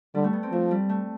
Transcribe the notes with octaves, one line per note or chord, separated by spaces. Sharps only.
D3 G3
A3
B3
C4
F3 A3
G3
A3